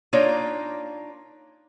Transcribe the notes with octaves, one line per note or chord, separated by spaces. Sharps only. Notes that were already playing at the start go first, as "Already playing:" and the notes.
A#3 D4 D#4 F4 C#5 D5